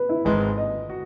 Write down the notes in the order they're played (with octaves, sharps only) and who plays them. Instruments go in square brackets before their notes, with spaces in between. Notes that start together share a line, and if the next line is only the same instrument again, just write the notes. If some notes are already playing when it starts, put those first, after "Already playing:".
Already playing: [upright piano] B4
E4
[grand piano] G#1 G#2 E3 G#3 [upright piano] B4
[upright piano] D#5
[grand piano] F#4